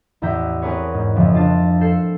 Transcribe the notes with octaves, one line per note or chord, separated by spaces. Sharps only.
A1 E2 E5 A#5 G6 B6
C4 G#4 A#4 B4 C#5
G#2
F2 A#2 C#3 E3 F3
D4 F4 C5 A5
A4 G6 C7 E7